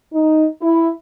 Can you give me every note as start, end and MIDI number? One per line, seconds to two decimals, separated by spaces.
0.12 0.45 63
0.62 0.89 64